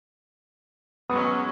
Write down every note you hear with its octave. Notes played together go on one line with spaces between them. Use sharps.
F#3 G#3 B3 C#4 D#6